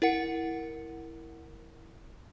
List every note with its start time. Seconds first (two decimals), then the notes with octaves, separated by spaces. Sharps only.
0.02 E4 A#4 F#5 C#7